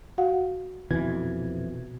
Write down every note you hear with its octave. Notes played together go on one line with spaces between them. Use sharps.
F#4 F5 F#5
F2 B2 E3 G#6